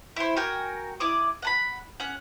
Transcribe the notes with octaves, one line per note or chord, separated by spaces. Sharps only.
E4 C5
F#4 A#4 G5 G#5
E4 D5 D6 D#6
F#5 A5 B5
C#4 F#5